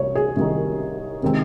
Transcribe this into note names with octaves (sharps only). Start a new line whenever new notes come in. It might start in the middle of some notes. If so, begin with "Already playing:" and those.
Already playing: C2 C3 C#5
G#4
C2 C3 D#3
C3 D#3 G#3 C4